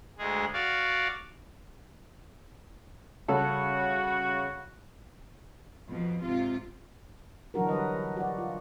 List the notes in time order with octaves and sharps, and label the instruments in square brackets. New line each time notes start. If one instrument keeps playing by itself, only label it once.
[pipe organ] D2 G#3 G#4
F#4 D5 F5
[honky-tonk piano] C#3 [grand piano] G3 [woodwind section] F#4 [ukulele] A4
[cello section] F2 B2 F3
G#2 C3 F4
[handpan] D3 E3 F#3 D4 F#4 A#4
G3 B4 D#5
F#4 D5
F4